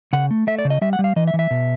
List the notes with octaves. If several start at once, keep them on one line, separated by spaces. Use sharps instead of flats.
C#3 F#5
A3
A3 E5
D5
C#3
D#5
G3 E5
F#5
G3
F5
E3 D#5
E5
E3
E5
B2